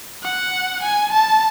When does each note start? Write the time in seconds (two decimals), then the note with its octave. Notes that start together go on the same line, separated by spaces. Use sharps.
0.23 F#5
0.83 G#5
1.13 A5